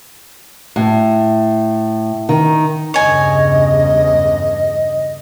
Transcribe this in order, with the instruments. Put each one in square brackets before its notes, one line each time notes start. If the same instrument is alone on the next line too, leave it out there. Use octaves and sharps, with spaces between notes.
[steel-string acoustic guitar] A2
D#3
[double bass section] E2 G2 C#3 [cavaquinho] C#5 G#5 [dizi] D#5